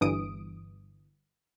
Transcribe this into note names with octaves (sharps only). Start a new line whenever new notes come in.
G1 G2 E3 D#6 D7